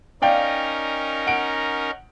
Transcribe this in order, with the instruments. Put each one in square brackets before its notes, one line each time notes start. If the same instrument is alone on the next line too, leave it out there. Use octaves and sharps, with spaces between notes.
[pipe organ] C#4 D#4 A#4 [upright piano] D5 F5 G5
[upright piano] F#5 D7